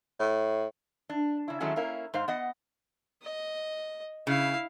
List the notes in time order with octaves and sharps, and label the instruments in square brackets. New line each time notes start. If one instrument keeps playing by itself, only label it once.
[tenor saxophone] A2
[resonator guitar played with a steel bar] D4
C#3 E4
D#3 F#3 G#3 A3 C#4 E4
A#3 C#4 E4 A#4 F5
G#2 C5 F5
B3 D#5 F#5
[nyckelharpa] D#5
[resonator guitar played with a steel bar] C#3 [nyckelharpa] E4 F5